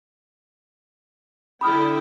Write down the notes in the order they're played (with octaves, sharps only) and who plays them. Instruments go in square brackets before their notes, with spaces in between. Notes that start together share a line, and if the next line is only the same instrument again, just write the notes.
[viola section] D3 E4 G5 [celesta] B5 D#6 F6